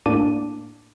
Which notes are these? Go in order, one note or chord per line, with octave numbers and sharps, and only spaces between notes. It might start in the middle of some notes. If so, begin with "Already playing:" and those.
A2 A#3 D4 A5 D6 D#7